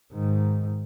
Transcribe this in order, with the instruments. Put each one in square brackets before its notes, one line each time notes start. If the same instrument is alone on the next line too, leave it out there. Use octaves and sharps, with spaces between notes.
[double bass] G#2 D#3